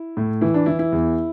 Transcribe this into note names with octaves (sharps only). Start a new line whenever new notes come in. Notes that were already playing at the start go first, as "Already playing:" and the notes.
Already playing: E4
A2
E3 E4
D4
E3 E4
E4
E2